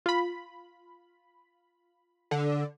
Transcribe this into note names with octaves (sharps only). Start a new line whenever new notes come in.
F4 B5
D3